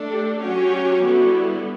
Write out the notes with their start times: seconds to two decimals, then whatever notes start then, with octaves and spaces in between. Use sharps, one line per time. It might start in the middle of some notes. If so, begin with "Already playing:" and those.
Already playing: A3 D4 A4
0.11 G4
0.43 F#3 C#4 F#4 G4 C#5
0.72 F#4
1.04 D3 G3 B3 E4